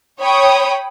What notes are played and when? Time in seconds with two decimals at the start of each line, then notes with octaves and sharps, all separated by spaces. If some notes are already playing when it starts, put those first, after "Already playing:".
0.20 C#5 G5 B5 D#6